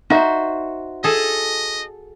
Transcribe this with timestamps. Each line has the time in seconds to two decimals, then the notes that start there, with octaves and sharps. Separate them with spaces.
0.10 D#4 F#4 C5 E5
1.04 G#4 A4 D#5